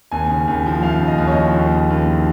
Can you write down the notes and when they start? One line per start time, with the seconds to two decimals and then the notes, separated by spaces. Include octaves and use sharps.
0.11 D#2 G#5
0.30 C#3
0.48 D#2
0.66 F3
0.83 D#2 F5
1.02 C#3
1.08 D#5
1.18 D#2
1.27 C#5
1.31 D#5
1.37 F3
1.54 D#2
1.72 C#3
1.90 D#2
2.07 F3